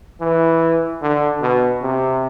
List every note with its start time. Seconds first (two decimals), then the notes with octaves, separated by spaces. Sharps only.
0.21 E3
1.02 D3
1.42 B2
1.83 C3